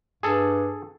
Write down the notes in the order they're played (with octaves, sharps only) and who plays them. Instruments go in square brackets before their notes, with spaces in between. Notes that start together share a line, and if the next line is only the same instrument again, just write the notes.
[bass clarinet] G2 [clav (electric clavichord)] G#4 A4